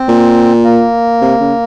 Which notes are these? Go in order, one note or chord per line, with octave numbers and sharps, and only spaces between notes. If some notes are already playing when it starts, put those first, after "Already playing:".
Already playing: C4
A#2
A#3
C3
C#3